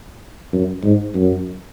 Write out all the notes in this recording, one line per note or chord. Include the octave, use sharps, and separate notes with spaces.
F#2
G#2
F#2